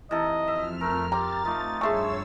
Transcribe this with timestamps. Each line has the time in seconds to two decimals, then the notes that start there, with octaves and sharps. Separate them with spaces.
0.11 C3 E3 D#4 A4 D#5
0.48 F2 E5 F6
0.81 A3 A#4
1.12 C4 G4 A#5 A6
1.45 F3 A3 D#4 D6
1.81 G2 G#4 A4 C#5 E5 C6 C#6 E6